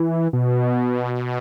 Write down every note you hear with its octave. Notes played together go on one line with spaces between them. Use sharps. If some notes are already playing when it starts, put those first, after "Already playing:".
Already playing: E3
B2